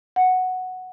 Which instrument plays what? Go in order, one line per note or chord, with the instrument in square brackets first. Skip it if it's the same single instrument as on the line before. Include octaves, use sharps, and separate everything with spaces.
[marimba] F#5